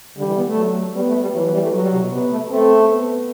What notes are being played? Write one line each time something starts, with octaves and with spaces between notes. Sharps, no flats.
D3 G3
E3
B3
A3
F#3
G3 B3
A3
G3
E3 F#3
F#3
G3
A3
F#3
G3
C3
B2
C3 B3
A3
A3 C4
B3